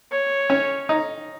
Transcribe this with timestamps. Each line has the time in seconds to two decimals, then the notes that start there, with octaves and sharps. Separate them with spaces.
0.11 C#5
0.50 C#4
0.89 D#4